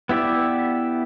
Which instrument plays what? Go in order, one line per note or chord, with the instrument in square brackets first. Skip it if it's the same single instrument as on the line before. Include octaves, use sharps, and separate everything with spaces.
[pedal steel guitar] B3 E4 G4 D5 E5